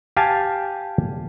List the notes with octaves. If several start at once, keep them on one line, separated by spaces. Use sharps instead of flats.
G4 F5 G#5 A5